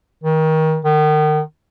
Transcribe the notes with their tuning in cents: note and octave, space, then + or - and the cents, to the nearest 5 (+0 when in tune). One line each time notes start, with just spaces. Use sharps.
D#3 +25
D#3 -30